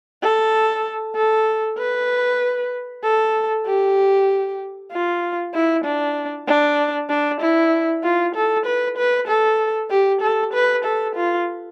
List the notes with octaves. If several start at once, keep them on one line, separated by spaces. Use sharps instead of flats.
A4
A4
B4
A4
G4
F4
E4
D4
D4
D4
E4
F4
A4
B4
B4
A4
G4
A4
B4
A4
F4